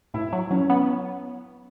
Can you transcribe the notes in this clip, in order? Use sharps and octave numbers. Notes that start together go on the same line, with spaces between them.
A2 E4
F#3
F#3 C#4
B3